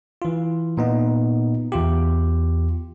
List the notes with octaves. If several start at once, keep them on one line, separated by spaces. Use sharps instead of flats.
E3 F4
A#2 B3 D#4
E2 F4 G4